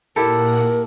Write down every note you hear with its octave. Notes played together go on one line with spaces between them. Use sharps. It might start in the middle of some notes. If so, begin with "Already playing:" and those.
A#2 A#3 E4 G4 A4 A#4 F#5